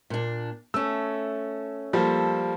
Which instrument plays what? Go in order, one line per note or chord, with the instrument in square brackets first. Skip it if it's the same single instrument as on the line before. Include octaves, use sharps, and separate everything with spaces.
[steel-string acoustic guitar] A#2 D4
[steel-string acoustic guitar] A3 C#4 [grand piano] E6
[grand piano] F3 G3 A#3 [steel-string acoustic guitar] A4